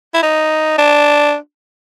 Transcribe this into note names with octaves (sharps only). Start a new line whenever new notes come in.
E4
D#4
D4